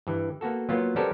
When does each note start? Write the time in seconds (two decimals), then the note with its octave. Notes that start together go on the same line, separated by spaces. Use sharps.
0.07 G2 E3
0.41 A#3 B3 F#4 A4
0.69 F#3 A#3 B3 F4
0.96 G3 B3 C#4 A4 A#4 C5